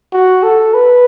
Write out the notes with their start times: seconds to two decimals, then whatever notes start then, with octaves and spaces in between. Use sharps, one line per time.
0.12 F#4
0.43 A4
0.74 B4